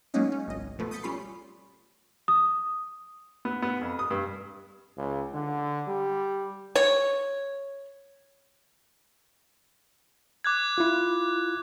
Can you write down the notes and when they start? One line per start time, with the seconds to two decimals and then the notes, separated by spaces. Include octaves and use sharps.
0.14 F#3 G#3 A#3 C#4 D#4
0.32 C#4
0.48 G#1 C#2 D#5
0.79 B2 F3 A3 B3
0.91 D#6 G6 A6 B6 C#7
1.03 G3 C#4 F4 B5 C7
2.28 D#6
3.45 B3
3.62 B3
3.81 F2
3.99 D#6
4.11 G2
4.97 C#2
5.34 D3
5.88 G3
6.75 C#5
10.44 D6 F#6 G#6
10.78 E4 F4